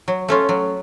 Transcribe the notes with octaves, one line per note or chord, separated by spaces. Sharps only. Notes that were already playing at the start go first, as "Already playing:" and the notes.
F#3
A3 C#4 F4
F#3